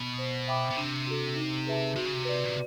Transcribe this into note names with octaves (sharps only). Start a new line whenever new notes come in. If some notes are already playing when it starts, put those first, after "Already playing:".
Already playing: B2
C5
E5 G5 B5 D6
B2
C3 D4
F#4 A4
D#4
G#4 B4 E5 A5
C3 F#4
C#3
C3
B4 D5
A#2